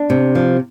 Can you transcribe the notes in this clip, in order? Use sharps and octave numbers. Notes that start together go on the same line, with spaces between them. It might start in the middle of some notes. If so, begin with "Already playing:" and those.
Already playing: D4
C3
F3